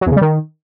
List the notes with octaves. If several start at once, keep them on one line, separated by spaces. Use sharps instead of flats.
F#3
E2
C#3
G3
D#3